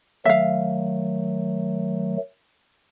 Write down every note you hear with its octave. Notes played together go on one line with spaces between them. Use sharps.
D#3 F#3 A3 E5 F5